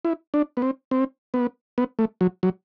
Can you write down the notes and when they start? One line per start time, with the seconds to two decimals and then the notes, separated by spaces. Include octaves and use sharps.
0.05 E4
0.34 D4
0.57 B3
0.62 C4
0.91 C4
1.34 B3
1.78 B3
1.99 A3
2.21 F#3
2.43 F#3